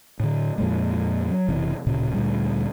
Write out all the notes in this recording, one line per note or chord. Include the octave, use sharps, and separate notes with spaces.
A2 D3
F2 A#2 G#3
F#3
F#1 C3 E3
D1 A#2 C#3
D2 A#2 G3